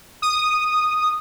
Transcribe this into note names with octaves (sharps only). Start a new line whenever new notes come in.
D#6